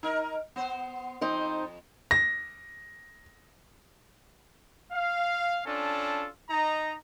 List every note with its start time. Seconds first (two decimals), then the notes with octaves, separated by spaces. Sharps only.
0.03 D#4 A#4
0.56 B3 C5
1.21 F2 C4 D#4 C5
2.11 A#6
4.92 F5
5.66 C#4 D4 F4 A4
6.50 D#4 A#5